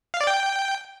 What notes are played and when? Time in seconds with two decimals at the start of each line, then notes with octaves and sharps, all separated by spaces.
0.14 F5
0.21 D5
0.27 G5